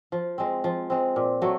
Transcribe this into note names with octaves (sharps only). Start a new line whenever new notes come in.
F3
G#3 C4
F3
G#3 C4
A#2
F#3 A3